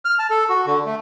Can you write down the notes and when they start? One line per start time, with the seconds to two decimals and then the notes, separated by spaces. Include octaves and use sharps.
0.05 F6
0.19 A5
0.30 A4
0.49 F#4
0.67 D3
0.86 A3